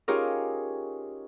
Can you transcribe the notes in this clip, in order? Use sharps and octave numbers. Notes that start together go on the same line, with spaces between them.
C#4 D#4 F4 G4 G#4 A#4